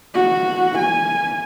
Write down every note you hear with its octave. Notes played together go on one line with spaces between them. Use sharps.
F#4
G#5